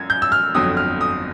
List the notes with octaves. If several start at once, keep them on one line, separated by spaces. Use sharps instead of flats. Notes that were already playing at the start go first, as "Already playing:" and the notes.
Already playing: F#2 G#6
G6
E6
F6
G1 F2 D3 F#3 D#6
F6
D#6